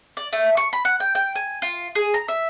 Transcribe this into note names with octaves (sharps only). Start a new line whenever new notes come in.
D5
A3
C#6
B5
F#5
G5
G5
G#5
F4
G#4
A#5
E5